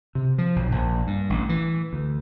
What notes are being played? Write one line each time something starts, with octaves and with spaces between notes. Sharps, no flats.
C3
F3
B1
A#1
G2
A1
E3
D2